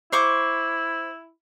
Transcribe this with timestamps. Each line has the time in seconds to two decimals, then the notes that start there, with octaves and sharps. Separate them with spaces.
0.12 E4 C5 C#6 D6